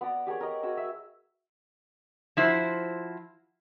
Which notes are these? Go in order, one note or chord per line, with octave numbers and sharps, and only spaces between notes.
B3 D5 A#5
G4 G#4 A#4 C#5
A#4 D#5
F#4 G#4 E6
E5
F3 E4 F#4 C5